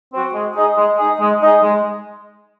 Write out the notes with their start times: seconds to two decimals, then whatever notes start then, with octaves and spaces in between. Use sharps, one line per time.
0.13 C4 F#4
0.34 G#3
0.56 D#4 G#4
0.77 G#3
0.98 D#4 G#4
1.20 G#3
1.41 D#4 G#4
1.63 G#3